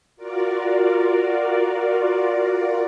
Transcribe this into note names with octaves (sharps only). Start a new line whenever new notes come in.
F4 F#4 A#4 D5